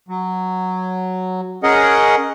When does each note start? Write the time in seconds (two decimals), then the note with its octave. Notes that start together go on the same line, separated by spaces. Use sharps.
0.09 F#3
1.63 C#4 G#4 A#4 D#5 F#5